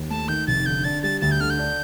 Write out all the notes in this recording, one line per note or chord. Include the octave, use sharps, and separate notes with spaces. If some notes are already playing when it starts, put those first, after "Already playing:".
Already playing: D#2
A3 A5
D#3 G6
F1 A6
D3 G6
D4 A6
G3 A6
D2 A6
G6
D3 F6
G6
D4